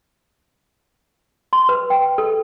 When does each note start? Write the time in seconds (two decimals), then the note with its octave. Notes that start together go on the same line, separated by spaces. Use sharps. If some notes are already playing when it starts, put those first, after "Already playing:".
1.53 C6
1.69 B4
1.90 G5
2.18 A4